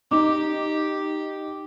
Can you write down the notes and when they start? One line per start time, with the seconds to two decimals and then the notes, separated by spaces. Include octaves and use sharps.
0.11 D#4 G4 D6